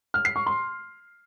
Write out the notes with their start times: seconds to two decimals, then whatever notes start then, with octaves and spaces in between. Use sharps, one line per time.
0.14 F6
0.25 C7
0.36 C#6
0.46 C6